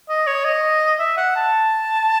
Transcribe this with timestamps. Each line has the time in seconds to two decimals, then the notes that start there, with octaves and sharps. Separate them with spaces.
0.09 D#5
0.27 C#5
0.45 D#5
0.99 E5
1.17 F#5
1.36 A5